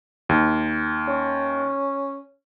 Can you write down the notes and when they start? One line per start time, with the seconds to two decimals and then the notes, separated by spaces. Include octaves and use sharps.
0.29 D#2
1.08 C#4